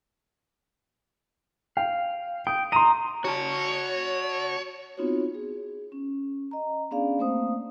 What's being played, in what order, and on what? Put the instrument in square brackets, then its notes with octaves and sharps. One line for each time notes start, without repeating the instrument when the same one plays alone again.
[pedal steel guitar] F5 [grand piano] G5
[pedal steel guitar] G5 [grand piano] D#6
[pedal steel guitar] D#5 A#5 [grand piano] C6 D#7
[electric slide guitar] F#4 A5 [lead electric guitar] C#5
[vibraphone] B3 C4 D#4 F4 F#4 C#5
G#4
C#4
D#5 A#5
B3 C#4 D4 G#4 D5 F5
A3 A#3 C4 C5 F5 D#6